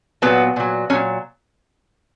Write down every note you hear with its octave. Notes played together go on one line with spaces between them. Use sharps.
A#2 F#3 B3
A#2 F#3
A#2 F#3 C#4